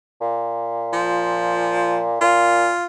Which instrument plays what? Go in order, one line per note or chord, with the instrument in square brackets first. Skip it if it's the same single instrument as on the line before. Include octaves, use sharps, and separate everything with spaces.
[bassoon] A#2
[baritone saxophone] F3
[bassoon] A#2 [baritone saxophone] F4